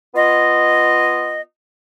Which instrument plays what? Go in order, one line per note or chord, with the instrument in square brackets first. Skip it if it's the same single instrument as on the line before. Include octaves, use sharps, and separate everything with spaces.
[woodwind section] B3 F4 D#5